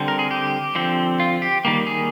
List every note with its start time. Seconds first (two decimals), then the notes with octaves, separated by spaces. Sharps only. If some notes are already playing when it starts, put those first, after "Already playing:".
Already playing: D3 G3 C4
0.08 A#4
0.19 G#4
0.31 G4
0.75 D3 F3 C4
1.20 F4
1.42 G4
1.65 D#3 G3 A#3
1.87 G#4